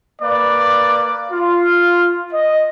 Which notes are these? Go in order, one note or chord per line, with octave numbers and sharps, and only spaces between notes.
A#3 B4 D5
F4
D#5